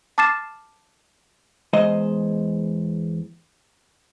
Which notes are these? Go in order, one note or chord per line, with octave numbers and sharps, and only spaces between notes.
A5 D6 F6 A6 C7 E7
E2 G#3 C5 D#5